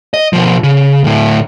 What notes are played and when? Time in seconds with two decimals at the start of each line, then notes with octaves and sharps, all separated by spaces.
0.14 D#5
0.33 B2 F3
0.63 C#3
1.04 D2 A2